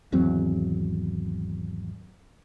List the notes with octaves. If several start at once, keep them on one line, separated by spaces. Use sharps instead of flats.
G#1 E2 F#3 C4